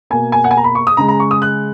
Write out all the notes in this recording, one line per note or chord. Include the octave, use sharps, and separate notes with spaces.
B2 A#3 G#5
G#5
F#5
G#5
A#5
B5
C#6
D#6
C#3 G#3 A#5
A#5
C#6
D#6
F#6